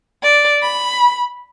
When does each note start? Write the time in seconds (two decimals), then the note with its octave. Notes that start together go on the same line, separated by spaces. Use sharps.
0.23 D5
0.62 B5